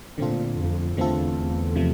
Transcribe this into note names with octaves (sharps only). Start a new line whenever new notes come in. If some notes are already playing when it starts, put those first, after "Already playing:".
A#2 D3 A3 C4 F4 A4
F2
E2 D3 A3 C4 F4 A4
C3 F3 A3